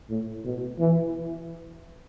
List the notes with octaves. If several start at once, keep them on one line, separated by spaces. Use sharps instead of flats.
A2
B2
E3